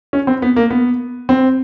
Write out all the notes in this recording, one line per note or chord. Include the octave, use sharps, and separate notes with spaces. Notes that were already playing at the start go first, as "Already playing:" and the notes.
C#4
C4
B3
A#3
B3
C4